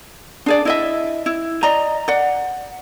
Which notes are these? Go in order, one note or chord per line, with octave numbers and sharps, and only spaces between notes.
D4 G#4 D5
E4 D#5 E5
E4
D5 D#5 A#5
D5 F#5